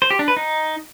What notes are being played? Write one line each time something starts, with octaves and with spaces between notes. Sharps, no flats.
C5
G4
D4
B4
D#4